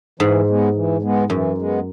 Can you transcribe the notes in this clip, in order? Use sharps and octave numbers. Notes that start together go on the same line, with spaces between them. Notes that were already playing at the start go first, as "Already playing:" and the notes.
G#2 E3
G#3 B3
E3
G#3 B3
F#2 E3
G#3 B3